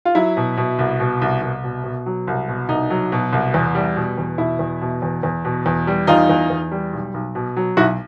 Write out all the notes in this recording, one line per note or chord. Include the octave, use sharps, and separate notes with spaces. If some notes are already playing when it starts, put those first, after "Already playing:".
F4
F#3 E4
B2
B2
C2
B2
C2
C2
B2
B2
F#3
C2
B2
C2 D#4
F#3
B2
C2
E2
G3
B2
E2
B2 E4
E2
B2
E2
E2
B2
E2
G3
E2 D#4 F4
E2
E2
G3
B1
B1
B2
F#3
B1 E4 F#4